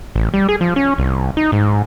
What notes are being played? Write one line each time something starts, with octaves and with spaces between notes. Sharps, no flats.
A1
G3
G#4
F3
C#4
C2
D#4
G#2